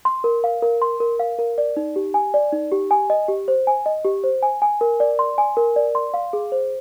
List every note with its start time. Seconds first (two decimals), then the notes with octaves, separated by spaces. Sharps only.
0.05 C6
0.24 A#4
0.44 F5
0.62 A#4
0.82 C6
1.00 A#4
1.20 F5
1.39 A#4
1.58 D5
1.77 D#4
1.96 G4
2.14 G#5
2.34 D5
2.52 D#4
2.72 G4
2.91 G#5
3.10 D#5
3.28 G4
3.48 C5
3.67 G#5
3.86 D#5
4.05 G4
4.24 C5
4.43 G#5
4.62 G#5
4.81 A#4
5.00 D5
5.19 C6
5.38 G#5
5.57 A#4
5.76 D5
5.95 C6
6.14 F5
6.33 G#4
6.52 C5